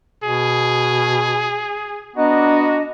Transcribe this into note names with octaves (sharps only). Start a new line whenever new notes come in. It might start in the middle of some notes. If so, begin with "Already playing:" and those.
B2 G#4
B3 D4 F#4 D#5 A#5